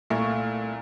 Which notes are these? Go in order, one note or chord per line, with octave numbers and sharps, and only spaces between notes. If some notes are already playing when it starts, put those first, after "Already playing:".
C2 A#2 A3 E4 A#4 F5 C#6